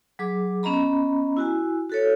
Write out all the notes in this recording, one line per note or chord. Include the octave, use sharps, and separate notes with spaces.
F#3 G#4 D6
B3 C#4 D#5 A#5 B5
E4 F#4 G#5
F#4 A4 C#5